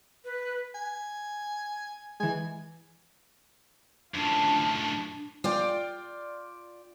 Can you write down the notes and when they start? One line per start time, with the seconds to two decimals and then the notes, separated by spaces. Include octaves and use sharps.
0.25 B4
0.75 G#5
2.20 E3 G#3 G#5
4.14 F#2 A2 D4 F4 A5
5.44 F4 D5 G5